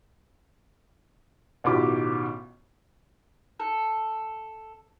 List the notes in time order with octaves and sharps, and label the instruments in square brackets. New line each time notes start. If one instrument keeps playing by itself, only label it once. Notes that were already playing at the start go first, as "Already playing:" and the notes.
[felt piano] A1 B2 D#3 F4 G4 D6
[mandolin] A4